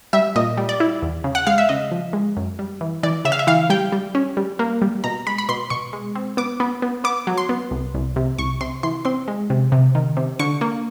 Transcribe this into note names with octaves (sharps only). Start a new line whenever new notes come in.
G3 E5
A#2 D#5
G3
D5
E4
E2
C#3
F#5
G#3 F5
E5
C#3 D#5
F3
G#3
F#2
G3
E3
E3 D5
C#3 E5
F5
E5
E3 F5
G3 G5
G3
C#4
G3
A#3
G3
B2 A#5
G#3 B5
B5
B2 C6
B2 C#6
G#3
C4
B3 D6
B3
B3
B3 D6
F#3
C6
B3
C2
C2
C3
C2 C#6
C3 C6
E3 C6
C4 C6
G#3
C3
C3
D#3
C3
D3 C#6
A#3